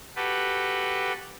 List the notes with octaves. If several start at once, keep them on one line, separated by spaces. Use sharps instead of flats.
F#4 G4 A4 B4